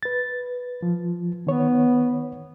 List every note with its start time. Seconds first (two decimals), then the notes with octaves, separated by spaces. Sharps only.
0.03 B4 A6
0.83 F3
1.47 D#3 B3 C#5